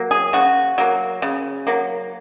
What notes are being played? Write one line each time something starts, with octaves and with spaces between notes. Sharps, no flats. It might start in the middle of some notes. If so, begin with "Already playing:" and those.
Already playing: F#3 A#3
G#4
C#3 F#4
F#3 A#3
C#3
F#3 A#3